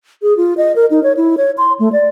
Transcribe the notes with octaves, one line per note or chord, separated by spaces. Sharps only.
G#4
F4
D#5
A#4
D#4
C#5
E4
C#5
C6
A3
D5